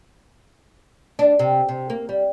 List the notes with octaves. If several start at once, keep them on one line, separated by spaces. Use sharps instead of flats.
D4
C3
C3
A#3
G3